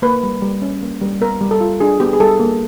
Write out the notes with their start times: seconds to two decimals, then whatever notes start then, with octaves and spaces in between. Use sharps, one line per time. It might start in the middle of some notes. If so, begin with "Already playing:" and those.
0.02 A#3 B4
0.23 G3
0.42 G3
0.62 C#4
0.82 A#3
1.01 G3
1.21 B3 A#4
1.41 G3
1.51 A4
1.61 F4
1.80 D4 G#4
2.00 B3 G4
2.13 G#4
2.20 G3 A4
2.40 A#3